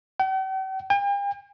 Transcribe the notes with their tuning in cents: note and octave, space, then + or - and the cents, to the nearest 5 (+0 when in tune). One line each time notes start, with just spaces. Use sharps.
G5 -45
G5 +45